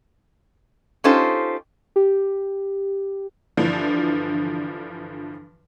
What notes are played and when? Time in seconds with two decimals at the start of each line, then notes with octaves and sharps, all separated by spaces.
1.04 C#4 D#4 F4 G4 A4 C5
1.96 G4
3.57 G2 D3 E3 F3